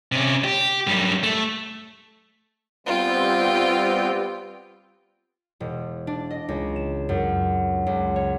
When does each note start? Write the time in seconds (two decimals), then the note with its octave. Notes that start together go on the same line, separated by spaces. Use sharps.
0.12 C3 C#4
0.44 G4
0.87 F#2 G3
1.23 A3
2.86 G3 B3 C4 F4 G5
5.60 E1
6.07 D4
6.30 D#5
6.49 C#2
6.76 E7
7.09 F#2
7.87 C#2
8.16 C#5